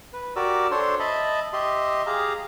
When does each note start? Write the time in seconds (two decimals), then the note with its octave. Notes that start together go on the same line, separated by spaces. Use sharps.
0.13 B4
0.36 F#4 G4 A#4 D5 D6 E6
0.71 D4 A4 C5 C#5 C6
1.00 D#5 E5 A5 B5
1.53 G4 D#5 E5 C6
2.06 G4 G#4 F5 A#5